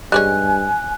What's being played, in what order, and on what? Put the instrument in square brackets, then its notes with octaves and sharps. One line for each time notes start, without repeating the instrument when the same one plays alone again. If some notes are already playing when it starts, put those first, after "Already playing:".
[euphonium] G2 [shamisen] G3 G#3 C#4 [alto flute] G#5 [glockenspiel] F#6